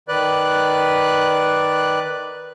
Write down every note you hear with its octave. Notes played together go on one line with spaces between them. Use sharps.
D#3 B4 D5 F#6